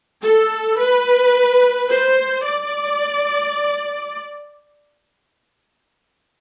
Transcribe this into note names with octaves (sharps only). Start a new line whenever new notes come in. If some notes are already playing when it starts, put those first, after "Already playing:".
A4
B4
C5
D5